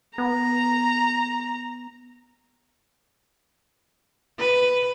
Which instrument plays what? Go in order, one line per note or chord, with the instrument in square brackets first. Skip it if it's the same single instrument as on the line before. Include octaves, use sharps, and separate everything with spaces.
[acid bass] B3 [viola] A#5
[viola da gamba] B4